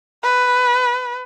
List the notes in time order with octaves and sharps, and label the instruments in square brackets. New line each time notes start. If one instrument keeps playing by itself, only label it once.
[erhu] B4